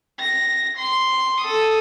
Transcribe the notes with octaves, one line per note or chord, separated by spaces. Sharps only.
A#6
C6
A4 D#6